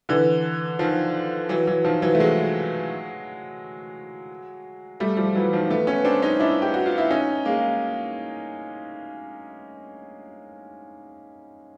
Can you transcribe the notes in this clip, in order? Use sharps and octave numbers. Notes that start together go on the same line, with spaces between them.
D3 E3
D#3 F3
E3 F#3
E3 F#3
D#3 F3
E3 F#3
A3
F#3 G#3
G3 A3
F3 G3
E3 F#3
D#3 F3
A3 B3
B3 C#4
C4 D4
C#4 D#4
D4 E4
G4
F#4
F4
E4
C#4 D#4
G#3 A#3